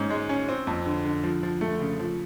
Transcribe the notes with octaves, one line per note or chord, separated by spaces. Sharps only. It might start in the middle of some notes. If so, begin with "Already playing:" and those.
Already playing: G#2 C#4
G#3
C#4
C4
F2
D3
D3
F3
F3
A3
C#3
F3